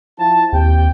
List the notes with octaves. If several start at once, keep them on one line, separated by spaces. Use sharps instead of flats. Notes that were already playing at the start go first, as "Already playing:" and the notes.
F3 E4 A5
D#2 C4 G4 G5